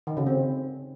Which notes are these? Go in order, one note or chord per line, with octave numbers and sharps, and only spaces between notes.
D#3
C#3
C4